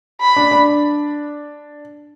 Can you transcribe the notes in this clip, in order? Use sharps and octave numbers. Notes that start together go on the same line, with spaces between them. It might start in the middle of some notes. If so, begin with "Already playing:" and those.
B5
D4
D4